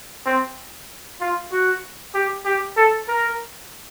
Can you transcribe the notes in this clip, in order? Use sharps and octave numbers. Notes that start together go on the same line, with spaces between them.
C4
F4
F#4
G4
G4
A4
A#4